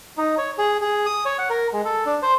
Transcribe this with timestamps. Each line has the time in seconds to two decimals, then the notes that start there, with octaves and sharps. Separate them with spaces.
0.18 D#4
0.38 C#5
0.58 G#4
0.81 G#4
1.06 D#6
1.25 C#5
1.38 F#5
1.50 A#4
1.73 G#3
1.85 A4
2.06 D4
2.22 C5